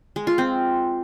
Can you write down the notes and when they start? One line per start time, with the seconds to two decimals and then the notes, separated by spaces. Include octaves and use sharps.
0.16 G#3
0.27 F4
0.38 C4